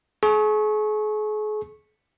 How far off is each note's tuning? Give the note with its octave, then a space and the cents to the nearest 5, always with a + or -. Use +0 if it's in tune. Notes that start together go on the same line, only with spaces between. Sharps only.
G#4 +40 C#6 -15